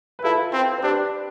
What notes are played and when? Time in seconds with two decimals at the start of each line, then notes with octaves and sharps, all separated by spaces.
0.19 B4
0.24 E4 F4 A4
0.53 C4
0.78 C5
0.83 D4 G4 B4